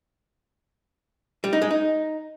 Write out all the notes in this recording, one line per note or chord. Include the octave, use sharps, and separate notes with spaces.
G3
D#4
G#3
D#4